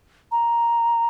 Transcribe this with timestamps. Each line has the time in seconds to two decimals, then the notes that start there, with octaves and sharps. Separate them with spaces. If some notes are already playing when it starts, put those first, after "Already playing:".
0.32 A#5